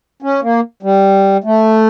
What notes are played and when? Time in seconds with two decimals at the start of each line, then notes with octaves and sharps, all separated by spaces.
0.22 C#4
0.42 A#3
0.83 G3
1.44 A3